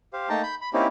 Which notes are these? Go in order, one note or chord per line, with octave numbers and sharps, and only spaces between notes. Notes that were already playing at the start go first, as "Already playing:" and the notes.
G4 C5 F5
A3 A#3 D#4 G5 A5 A#5
B5 G6
B5
A#3 C4 C#4 D#4 E4 G4